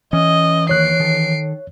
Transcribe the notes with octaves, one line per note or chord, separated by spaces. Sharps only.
E3 C#4 D#5
E2 D#3 A#3 C#5 F#6 C7 D7
D#3 A4